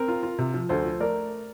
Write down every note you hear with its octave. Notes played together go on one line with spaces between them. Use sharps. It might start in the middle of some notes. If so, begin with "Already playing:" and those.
Already playing: C4 A#4
F4
F4
C3
F3
D2 A4 C5
F3
A3 A#4 D5